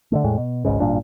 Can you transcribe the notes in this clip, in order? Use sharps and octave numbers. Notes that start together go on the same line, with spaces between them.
D3 D#3 A3
E2 A2 G#3
B2
G#1 C#2 G#2 C#3
G#1 G2 A#2 D4